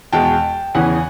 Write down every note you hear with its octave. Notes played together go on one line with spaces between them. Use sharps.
E2 B2 G#3 G5 A5
E2 C#3 E3 F#5 G#5